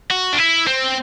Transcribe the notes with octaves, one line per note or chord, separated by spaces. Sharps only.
F#4
D4
E4
C4